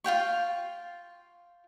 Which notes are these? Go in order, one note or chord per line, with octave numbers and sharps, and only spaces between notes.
F4 F5 G5 C#6